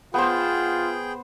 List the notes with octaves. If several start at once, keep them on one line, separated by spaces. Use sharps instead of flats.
B3 F4 G#4 C5 G5